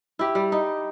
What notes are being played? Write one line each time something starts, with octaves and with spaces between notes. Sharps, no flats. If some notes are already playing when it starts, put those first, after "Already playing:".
E4 G4
G3
D#4